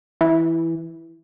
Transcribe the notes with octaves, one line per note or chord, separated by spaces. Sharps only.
E3